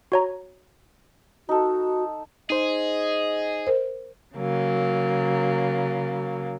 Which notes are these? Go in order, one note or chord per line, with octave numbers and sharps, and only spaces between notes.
F#4 C#5 A#5
D#4 F#4 A4
D#4 G#4 C5 D#5
A#4 C5
C#3 F#3 A#3